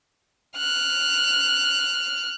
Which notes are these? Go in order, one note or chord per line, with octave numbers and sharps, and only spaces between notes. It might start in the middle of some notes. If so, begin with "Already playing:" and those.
F6 F#6